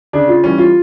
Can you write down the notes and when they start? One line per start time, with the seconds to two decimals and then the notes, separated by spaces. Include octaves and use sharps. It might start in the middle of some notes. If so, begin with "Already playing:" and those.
0.13 C#3 D4
0.28 F4
0.44 E3 G3 C#4
0.58 F4